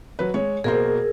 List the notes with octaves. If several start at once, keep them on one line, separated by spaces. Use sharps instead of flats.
F#3 B4
G#3 C#5
B2 A#3 G#4 A#4 C5